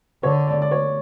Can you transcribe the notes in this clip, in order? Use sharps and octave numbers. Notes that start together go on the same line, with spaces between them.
D3 C#5
D5
D5
C#5